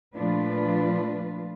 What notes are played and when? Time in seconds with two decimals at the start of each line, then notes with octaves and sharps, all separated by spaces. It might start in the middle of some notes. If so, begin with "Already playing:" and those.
0.16 A#2 F3 A3 D4 F4 B4